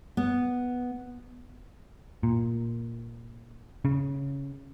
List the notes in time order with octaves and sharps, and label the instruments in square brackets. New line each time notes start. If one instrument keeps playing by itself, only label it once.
[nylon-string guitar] B3
[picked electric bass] A#2
C#3